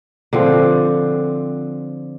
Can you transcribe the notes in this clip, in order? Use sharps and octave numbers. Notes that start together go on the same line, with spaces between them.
D3 F3 C4